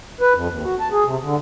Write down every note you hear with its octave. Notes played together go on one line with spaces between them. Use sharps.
B4
F2
D#2
F#4
A5
G#4
C3
D3